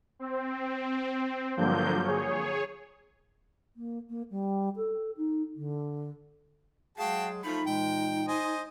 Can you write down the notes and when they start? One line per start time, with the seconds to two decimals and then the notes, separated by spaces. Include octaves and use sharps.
0.19 C4
1.57 G2 D3 F3 F#3 A#3 G6
2.05 G#4 C#5
3.76 A#3
4.09 A#3
4.30 G3
4.76 A4
5.17 D#4
5.56 D3
6.98 F#3 G#3 F#4 G#4 F5 G5 A5
7.44 F3 A3 D#4 B5
7.67 A#2 E3 G#3 G5
8.28 C5 D#5 G#5